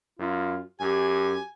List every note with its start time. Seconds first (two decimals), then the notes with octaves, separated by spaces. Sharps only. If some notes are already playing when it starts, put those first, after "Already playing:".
0.19 F#2 F4
0.80 F#2 G4 G#5